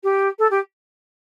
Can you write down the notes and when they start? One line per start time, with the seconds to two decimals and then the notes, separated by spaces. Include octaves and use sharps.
0.03 G4
0.39 A4
0.50 G4